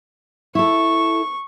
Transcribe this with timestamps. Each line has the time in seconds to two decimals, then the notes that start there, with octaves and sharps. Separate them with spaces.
0.55 E4 A4 C#6